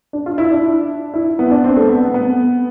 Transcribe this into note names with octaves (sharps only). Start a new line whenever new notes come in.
D4
F4
E4
D4
E4
B3
D4
C4
A3
B3
B3
B3